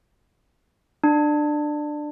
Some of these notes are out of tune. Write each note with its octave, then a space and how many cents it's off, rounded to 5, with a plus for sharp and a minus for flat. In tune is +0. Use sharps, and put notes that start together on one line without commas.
D4 +20